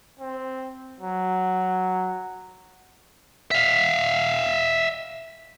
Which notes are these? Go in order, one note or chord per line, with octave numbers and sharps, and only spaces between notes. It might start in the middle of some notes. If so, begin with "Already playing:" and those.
C4
F#3
E5 F5